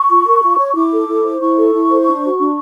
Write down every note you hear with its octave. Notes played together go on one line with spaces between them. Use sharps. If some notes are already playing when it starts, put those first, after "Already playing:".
Already playing: C#6
F4
A#4
F4
C#5
E4 D6
A4
E4
C5
E4 C#6
A4
E4
C5
D4
F#4
D4